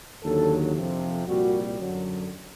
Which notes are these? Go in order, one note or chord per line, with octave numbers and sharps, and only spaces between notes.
D#2 D3 F#3 A4
F2 C3 F3
C2 A#2 G3 F#4
F#2 D3 F#3